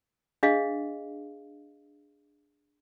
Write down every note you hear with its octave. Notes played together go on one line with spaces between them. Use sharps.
D4 G#4 D#5 F5